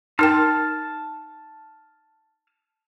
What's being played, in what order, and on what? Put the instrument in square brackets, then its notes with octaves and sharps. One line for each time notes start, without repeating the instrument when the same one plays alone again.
[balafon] D#4 A#4 G5 [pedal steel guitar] A5 F6